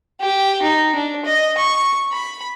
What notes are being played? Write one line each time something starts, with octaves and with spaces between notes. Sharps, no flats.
G4
D#4
D4
D#5
C#6
B5